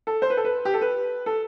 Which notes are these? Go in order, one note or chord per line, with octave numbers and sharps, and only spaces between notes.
A4
C5
B4
A4
B4
G4
A4
B4
A4